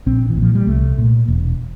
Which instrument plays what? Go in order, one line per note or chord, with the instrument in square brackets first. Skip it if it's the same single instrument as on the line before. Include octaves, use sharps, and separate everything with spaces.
[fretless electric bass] A#1 C4
E3
A#2
F3
G3
C2 A3
A#2
E1